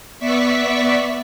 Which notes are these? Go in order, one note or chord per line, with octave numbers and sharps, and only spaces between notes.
B3 D5 E5 C#6 B6